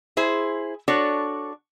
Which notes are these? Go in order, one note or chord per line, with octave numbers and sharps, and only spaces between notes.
E4 G#4 C5
D4 F#4 A4 C#5